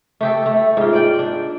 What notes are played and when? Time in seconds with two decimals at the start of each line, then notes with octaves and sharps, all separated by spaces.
0.21 A3 G4 A4
0.46 A3
0.77 G#2 F4
0.93 D5 G5
1.19 D4